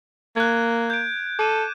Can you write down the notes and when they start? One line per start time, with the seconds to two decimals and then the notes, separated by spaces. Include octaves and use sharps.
0.36 A#3 F#6 G#6
0.90 G6 D7
1.39 A4 D6 D#7 E7